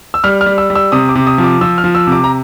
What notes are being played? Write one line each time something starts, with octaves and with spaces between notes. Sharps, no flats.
E6
G3 F6
F6
G3
E6
G3
E6
C3 D#6
D6
C3
D#6
F3
D6
F3 E6
F6
F3
E6
C3 D6
A#5